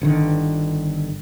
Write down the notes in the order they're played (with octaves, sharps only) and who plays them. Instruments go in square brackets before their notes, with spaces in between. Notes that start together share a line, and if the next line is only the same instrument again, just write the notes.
[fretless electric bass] G1 D3 D#3